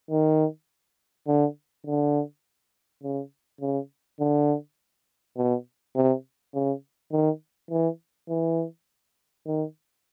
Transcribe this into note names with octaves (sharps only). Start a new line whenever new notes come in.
D#3
D3
D3
C#3
C#3
D3
B2
C3
C#3
D#3
E3
E3
D#3